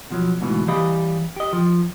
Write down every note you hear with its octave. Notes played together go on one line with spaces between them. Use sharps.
B2 F3 F#3
D2 G#2 B2 E3
E3 G3 G4 D#5 F5 B5
G4 D#5
F3